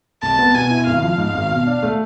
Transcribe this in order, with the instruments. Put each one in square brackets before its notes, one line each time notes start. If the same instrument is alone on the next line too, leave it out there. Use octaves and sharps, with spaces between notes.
[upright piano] C2 [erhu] A5
[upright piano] B3
[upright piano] B2 [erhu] G#5
[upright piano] E4
[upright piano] G#1 [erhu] F5
[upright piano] F3
G#2
G#1
B2
D4
A3